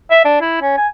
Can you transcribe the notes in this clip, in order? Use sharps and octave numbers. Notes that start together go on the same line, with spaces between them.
E5
D4
E4
C#4
G#5